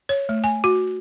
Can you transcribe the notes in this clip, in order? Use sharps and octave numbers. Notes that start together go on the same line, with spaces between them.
C#5
A3
G#5
F#4